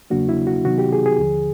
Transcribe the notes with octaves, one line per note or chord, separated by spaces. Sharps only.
E2 C#3 F#3 A#3 D4 F#4
E4
F#4
C3 D#3 F#3 B3 D#4 F#4
G4
G#4
G#4
D#2 D3 F3